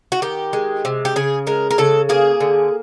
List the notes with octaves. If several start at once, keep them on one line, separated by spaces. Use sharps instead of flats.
F#4
D#3 G4
G#3
C3
G4
C#3 G#4
G#3 A#4
A#4
C#3 A4
A#3 G#4
D3